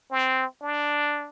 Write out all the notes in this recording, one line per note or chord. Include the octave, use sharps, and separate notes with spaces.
C4
D4